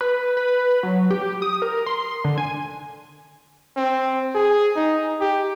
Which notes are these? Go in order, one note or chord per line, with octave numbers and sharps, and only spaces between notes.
B4
B4
F#3
G4
D#6
A#4
C6
D3
G#5
C4
G#4
D#4
G4